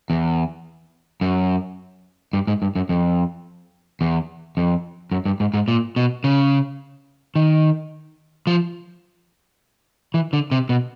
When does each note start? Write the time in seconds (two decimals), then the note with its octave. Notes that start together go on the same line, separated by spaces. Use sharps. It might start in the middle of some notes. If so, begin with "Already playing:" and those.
0.10 E2
1.21 F#2
2.33 G2
2.47 G#2
2.62 G2
2.75 F#2
2.89 F2
4.01 E2
4.57 F2
5.12 F#2
5.25 G2
5.40 G#2
5.54 G#2
5.68 A#2
5.96 B2
6.24 C#3
7.36 D#3
8.47 F3
10.14 E3
10.33 D3
10.52 C3
10.69 B2